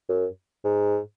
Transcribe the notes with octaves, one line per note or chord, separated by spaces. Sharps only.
F#2
G#2